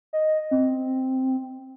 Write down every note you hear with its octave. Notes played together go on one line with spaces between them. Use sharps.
D#5
C4